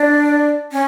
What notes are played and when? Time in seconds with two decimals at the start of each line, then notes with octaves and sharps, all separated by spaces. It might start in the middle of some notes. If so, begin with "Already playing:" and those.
Already playing: D4
0.72 C#4